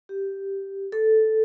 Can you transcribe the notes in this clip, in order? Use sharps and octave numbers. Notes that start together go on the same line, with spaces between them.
G4
A4